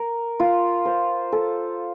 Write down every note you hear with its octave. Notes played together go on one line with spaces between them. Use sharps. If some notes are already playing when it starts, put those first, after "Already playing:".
Already playing: A#4
F4
C5
A4